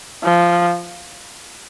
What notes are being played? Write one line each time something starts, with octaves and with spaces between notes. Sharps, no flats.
F3